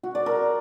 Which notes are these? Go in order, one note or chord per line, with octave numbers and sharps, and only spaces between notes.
F#4
D5
A#4